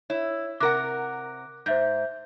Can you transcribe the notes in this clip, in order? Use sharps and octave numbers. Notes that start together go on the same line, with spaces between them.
E4 C#5
C3 A#4 F#5 D6 F#6
G#2 C5 E5 G6